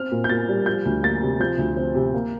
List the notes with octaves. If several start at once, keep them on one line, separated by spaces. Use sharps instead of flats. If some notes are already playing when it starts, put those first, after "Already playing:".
Already playing: C4 F6
A#2
G6
A#2 A6
G3
F3 G6
D2
A#3 A6
C3
F3 G6
D2
C4
C3
A#3